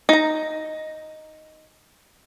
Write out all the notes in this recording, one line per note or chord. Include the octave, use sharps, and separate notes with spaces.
D#4 A#5